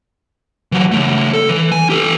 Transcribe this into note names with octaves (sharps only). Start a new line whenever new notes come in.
E3 F#3
C#3 A3
A4
E3
G#5
G4 A4